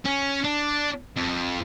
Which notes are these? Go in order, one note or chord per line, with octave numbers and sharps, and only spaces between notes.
C#4
D4
F2